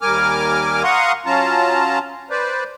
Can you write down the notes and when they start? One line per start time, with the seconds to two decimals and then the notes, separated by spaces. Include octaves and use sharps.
0.02 D#2 G3 A#4 G#5 D6 F6
0.84 F5 F#5 A#5 C6 C#6 D#6
1.26 F#3 C#4 F4 A5 A#5
2.30 B4 C5 D5